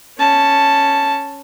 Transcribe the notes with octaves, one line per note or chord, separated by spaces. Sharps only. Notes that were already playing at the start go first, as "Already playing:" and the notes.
C#4 A5